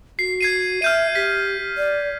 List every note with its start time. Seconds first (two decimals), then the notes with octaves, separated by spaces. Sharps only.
0.19 F#4 C7
0.41 G#6 C7 D#7
0.82 E5 F6 G6 D#7
1.15 G4 B6
1.78 D5